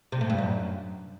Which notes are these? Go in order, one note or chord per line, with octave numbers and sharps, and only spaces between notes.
C3
A2
G2
F#2